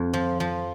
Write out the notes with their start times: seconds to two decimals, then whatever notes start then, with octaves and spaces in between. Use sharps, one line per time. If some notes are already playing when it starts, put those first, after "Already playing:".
Already playing: F2
0.14 F3
0.40 F3